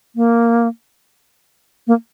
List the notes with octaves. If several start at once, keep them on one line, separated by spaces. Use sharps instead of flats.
A#3
A#3